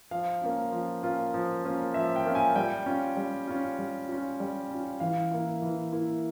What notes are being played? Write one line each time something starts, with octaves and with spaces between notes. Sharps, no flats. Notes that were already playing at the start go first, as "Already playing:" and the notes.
F3 F5
A#3 C#4 F4
F3
A#3 C#4 F4
F3
A#3 C#4 F4
F3 E5
G5
A#3 C#4 F4
G#5
G3 G5
C#4 F4
G3
C#4 F4
G3
C#4 F4
G3
C#4 F4
E3 F5
A#3 E4
E3
A#3 E4